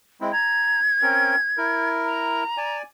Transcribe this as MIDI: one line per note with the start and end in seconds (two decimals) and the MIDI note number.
0.21 0.32 56
0.21 0.32 60
0.21 0.32 64
0.33 0.80 82
0.33 1.89 92
1.02 1.36 60
1.02 1.36 61
1.02 1.36 70
1.57 2.44 64
1.57 2.44 70
2.05 2.77 82
2.57 2.82 74
2.57 2.82 80